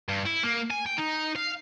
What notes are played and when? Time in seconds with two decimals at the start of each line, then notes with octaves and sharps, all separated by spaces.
0.09 G2
0.25 E4
0.43 A#3
0.70 G#5
0.86 G5
0.98 D#4
1.36 F5